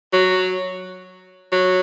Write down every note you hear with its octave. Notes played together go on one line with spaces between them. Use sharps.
F#3
F#3